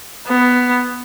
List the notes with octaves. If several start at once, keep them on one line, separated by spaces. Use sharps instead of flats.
B3